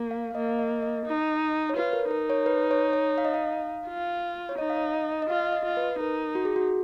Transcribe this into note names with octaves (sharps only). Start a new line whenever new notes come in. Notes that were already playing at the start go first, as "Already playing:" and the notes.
Already playing: A#3
F5
F5
A#3 D#5
D#5
D#5
D#4
C#5
F4 B4
A#4
D#4 A#4
C#5
B4
C#5
C#5
F5
D#5
F5
F4
C#5
D#4 D#5
F5
D#5
D#5
D#5
D#5
F4 F5
D#5
F4
B4
D#4 A#4
F#4
G#4
F#4